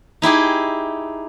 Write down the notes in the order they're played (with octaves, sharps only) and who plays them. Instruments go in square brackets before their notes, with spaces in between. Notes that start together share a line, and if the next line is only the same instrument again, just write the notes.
[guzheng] D#4 E4 G4 G#4